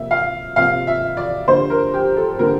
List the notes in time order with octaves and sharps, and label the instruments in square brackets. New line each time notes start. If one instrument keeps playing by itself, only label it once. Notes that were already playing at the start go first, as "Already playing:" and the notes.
Already playing: [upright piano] C3 F3 A#3 E5
F5
C3 F3 A#3 F5
E5
D5
D3 G3 A#3 C5
A#4
G4
A4
D3 G3 A#3 A#4